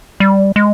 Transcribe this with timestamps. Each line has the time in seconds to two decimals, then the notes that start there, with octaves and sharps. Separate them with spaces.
0.20 G3
0.56 G#3